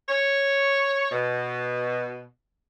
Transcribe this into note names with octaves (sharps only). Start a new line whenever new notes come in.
C#5
B2